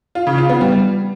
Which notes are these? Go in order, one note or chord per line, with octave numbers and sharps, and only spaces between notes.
F4
C#3
F4
B3
G3